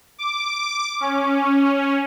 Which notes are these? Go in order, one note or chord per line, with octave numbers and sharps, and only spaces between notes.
D6
C#4